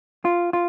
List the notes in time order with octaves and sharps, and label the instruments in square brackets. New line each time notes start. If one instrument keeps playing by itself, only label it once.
[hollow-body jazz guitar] F4
F4